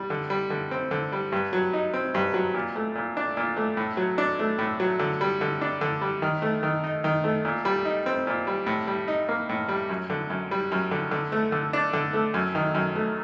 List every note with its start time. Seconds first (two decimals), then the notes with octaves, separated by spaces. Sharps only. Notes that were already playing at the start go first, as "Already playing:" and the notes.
Already playing: G3
0.10 D3
0.30 G3
0.50 D3
0.71 C4
0.91 D3
1.12 G3
1.32 G2
1.53 F#3
1.73 D#4
1.94 C4
2.14 G2
2.34 F#3
2.54 A#2
2.76 A3
2.95 A#2
3.17 D4
3.37 A#2
3.56 A3
3.77 A2
3.97 F#3
4.18 D4
4.39 A3
4.58 A2
4.80 F#3
4.99 D3
5.21 G3
5.41 D3
5.61 D4
5.81 D3
6.01 G3
6.22 D#3
6.42 A3
6.63 D#3
6.84 D#4
7.04 D#3
7.24 A3
7.45 A#2
7.65 G3
7.85 D#4
8.06 C4
8.27 A#2
8.47 G3
8.66 A2
8.87 G3
9.08 D#4
9.29 A#3
9.49 A2
9.68 G3
9.89 F#2
10.10 D3
10.30 F#2
10.51 G3
10.72 F#2
10.91 D3
11.11 D3
11.32 A3
11.52 D3
11.73 D4
11.93 D3
12.13 A3
12.34 F#2
12.55 D#3
12.75 F#2
12.95 A3